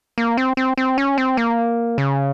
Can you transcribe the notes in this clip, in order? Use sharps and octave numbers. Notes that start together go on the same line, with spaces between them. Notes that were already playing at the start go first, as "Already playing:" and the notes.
A#3
C4
C4
C4
C#4
C4
A#3
C#3